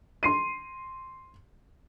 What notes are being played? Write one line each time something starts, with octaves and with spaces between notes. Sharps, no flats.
C6 C7 D#7